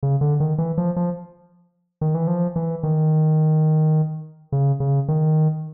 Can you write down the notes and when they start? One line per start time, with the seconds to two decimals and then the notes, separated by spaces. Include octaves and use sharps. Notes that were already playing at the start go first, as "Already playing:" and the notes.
0.03 C#3
0.21 D3
0.40 D#3
0.58 E3
0.78 F3
0.96 F3
2.01 D#3
2.15 E3
2.27 F3
2.56 E3
2.83 D#3
4.52 C#3
4.80 C#3
5.08 D#3